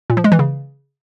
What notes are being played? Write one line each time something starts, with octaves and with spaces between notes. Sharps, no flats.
A#2
F3
G#3
E3
C#3